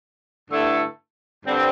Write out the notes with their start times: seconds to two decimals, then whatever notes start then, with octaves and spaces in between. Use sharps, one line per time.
0.50 G2 D3 A3 E4 A4
1.44 G2 D3 G3 C4